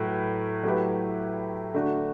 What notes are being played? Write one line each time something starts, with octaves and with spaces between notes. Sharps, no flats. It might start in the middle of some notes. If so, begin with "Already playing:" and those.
Already playing: A2 F#3 A3 E4 B4
F#3 A3 E4 G4 B4
D3 A3 D4 F#4